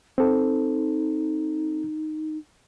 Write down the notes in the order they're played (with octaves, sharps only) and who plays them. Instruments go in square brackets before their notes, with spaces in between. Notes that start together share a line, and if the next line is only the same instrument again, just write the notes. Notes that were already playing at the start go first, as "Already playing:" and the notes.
[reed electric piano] C4 A4 [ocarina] D#4